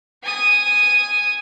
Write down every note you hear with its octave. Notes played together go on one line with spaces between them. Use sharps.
G#5 D#6